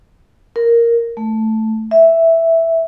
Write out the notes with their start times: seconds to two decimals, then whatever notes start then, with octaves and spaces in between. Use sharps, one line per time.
0.56 A#4
1.17 A3
1.91 E5